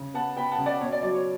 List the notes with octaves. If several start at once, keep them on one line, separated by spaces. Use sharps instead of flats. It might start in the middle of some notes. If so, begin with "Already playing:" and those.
Already playing: C#3
B3 F#5 A5
B3 G5 B5
F#5 A5
C#3
D5 F#5
B2 C#5
D5
F#3 D5
C#5